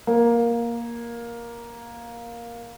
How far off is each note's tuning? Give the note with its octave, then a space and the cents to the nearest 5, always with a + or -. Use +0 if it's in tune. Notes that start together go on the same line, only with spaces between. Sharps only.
A#3 +10